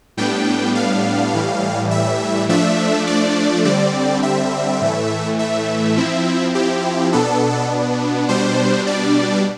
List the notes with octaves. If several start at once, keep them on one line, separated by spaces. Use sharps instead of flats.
A2 G3 B3 D4 G5
F5
A2 E3 G3
E5
F3 A3 D4 E5
D5
D3 G3 C4 D5
E5
A2 E3 A3
E5
F3 C4 E4
G4
B2 B3 D4 A4
B2 G3 D4 C5
D5